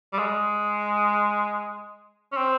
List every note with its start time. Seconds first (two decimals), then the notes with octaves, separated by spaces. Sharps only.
0.13 G3
0.19 G#3
2.32 C#4
2.37 C4